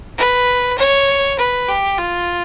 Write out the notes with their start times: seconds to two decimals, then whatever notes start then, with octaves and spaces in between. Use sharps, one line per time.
0.18 B4
0.78 C#5
1.39 B4
1.68 G4
1.98 F4